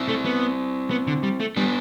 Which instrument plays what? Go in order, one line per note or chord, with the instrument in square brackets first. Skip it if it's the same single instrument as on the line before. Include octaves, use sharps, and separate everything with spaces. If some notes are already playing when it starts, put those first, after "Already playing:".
Already playing: [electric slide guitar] C4 E4
[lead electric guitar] A3
B3
B3
D3
G3
A3
[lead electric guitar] G3 [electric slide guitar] B3 D4